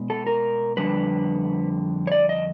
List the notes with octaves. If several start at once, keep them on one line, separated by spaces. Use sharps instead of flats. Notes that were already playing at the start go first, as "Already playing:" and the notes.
Already playing: B2 G#3 B3
A4
A#4
F2 D3 G3 B4
C#5
D5
D#5